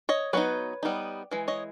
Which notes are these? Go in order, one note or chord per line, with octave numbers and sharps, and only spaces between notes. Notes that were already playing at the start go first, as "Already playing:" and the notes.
C#5 D#5
F#3 B3 D#4 B4 C#5
G3 B3 D#4
E3 G#3
C#5 D#5